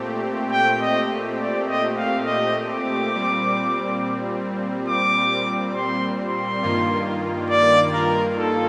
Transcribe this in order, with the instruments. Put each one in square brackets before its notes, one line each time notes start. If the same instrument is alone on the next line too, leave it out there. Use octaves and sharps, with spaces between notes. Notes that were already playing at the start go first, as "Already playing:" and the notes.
Already playing: [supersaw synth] A#2 A3 C4 G4
[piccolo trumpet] G5
D#5
D5
D#5
F5
D#5
D6
[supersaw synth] A#2 G3 C4
[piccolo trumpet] D6
C6
C6
[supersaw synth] G2 D#3 A#3 F4
[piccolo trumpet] D5
A#4
A4